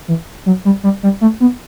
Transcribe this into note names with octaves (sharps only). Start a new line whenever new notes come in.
E3
F#3
G3
G3
G3
A3
B3